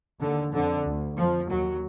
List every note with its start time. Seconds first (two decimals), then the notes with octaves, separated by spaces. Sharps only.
0.20 D#2 D3
0.53 F2 D3
0.86 D2
1.17 F2 F3
1.49 D#2 F#3